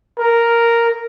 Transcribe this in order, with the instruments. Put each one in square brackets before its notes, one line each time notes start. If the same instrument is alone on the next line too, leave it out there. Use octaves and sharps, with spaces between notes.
[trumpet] A#4